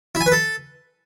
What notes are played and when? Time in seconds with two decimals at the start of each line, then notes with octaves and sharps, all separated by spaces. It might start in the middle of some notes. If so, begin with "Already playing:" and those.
0.15 E4
0.21 G#5
0.26 B4
0.32 A4